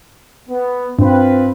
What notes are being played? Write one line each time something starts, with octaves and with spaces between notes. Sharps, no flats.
B3
G2 C4 F4 B4